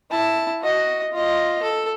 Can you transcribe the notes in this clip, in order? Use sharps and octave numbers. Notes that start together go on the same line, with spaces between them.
E4 A5
F#4 D#5
F4 D#5
A4